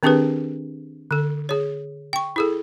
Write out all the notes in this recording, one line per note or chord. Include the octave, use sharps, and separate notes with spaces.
D#3 C4 D4 G4 G#4 B4
D3 A4
G#4 C#5
G5 C#6
E4 G#4 A4